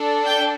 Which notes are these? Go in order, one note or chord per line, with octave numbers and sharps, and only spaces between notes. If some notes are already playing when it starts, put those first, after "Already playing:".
Already playing: D4 A4
G5